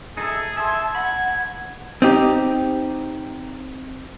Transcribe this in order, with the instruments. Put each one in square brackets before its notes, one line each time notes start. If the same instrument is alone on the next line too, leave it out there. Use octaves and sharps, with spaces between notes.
[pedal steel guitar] D#4 A4 E5 [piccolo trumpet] G#4
[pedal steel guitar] E5 C6 [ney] A5 [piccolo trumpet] G#6
[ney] F#5 [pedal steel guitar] B5
[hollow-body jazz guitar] C4 D#4 G4